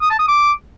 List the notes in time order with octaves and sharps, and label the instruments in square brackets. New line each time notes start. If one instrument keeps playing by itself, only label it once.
[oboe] D#6
A5
D#6
D6